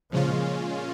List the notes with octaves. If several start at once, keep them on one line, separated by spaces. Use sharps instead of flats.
A#2 C#3 F3 G#3 C#4 F4